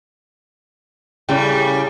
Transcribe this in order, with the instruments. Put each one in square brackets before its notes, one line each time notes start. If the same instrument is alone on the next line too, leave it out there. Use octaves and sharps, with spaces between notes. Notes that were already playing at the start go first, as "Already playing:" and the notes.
[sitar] A2 C#3 G3